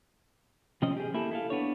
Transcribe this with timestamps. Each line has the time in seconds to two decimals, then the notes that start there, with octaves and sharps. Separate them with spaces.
0.82 C3 F3 C4 C#4 D#5
0.97 G4 G#4
1.14 A#3 E4 G4 A4
1.31 E4 A4 F5
1.50 B3 D4 C#5